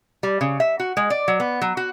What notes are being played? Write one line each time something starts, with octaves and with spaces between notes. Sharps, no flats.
G3
C#3
E5
F#4
G#3
D5
F#3
B3
F#3
F#4